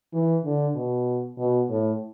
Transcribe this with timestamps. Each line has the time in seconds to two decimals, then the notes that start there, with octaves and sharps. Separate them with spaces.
0.13 E3
0.44 D3
0.75 B2
1.38 B2
1.69 A2